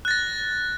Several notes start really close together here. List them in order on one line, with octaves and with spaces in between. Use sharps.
F#6 A6 A#6